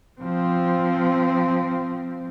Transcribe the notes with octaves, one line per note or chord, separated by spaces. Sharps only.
F3 C4